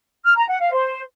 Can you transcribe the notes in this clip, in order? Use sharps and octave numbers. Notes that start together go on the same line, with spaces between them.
F6
A#5
F#5
F5
C5